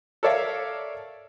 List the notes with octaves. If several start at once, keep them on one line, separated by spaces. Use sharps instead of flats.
A4 A#4 C#5 D5 E5 F5